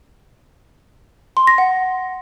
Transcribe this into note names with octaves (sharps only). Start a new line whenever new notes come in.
C6
A#6
F#5